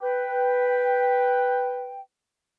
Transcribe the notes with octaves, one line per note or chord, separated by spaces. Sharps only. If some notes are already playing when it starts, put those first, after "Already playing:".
B4 G5